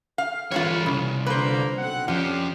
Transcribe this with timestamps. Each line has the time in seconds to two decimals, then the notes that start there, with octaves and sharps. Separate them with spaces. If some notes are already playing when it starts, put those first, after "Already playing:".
0.18 F5
0.52 G1 F#2 E3 F#3 G#3 F4 B4 C#5
0.86 C2 C#3
1.26 D3 F3 A#3 B4 C5
1.78 B1 C4 F#5
2.08 F2 F3 C#4 D4 F4 G4